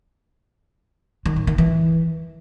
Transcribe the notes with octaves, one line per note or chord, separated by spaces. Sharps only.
D#3
A2
D#3
E3